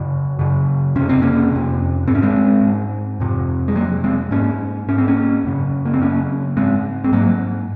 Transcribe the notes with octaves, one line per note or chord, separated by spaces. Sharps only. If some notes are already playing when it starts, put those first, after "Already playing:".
Already playing: F#2 C#3
F#2 C#3
F2 C3 C#4
C4
A#3 C#4
F2 C3
G#2 C4
C#4
G#3 C4
G#2
F2 C3
G#3
F2 C3 F#3 A#3
G#3 C4
G#2 A#3 C#4
G#2 C#4
C4
A#3 C#4
F#2 C#3
A#3
C4
F#2 C#3 A#3 C#4
G#2 G#3 C4
C4
G#2 F#3 A#3